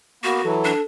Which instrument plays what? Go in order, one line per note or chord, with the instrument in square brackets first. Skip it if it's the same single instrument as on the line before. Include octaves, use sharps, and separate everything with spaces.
[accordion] A#3 B3 [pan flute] F#4
[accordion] E3 F#3 [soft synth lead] A4
[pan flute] D4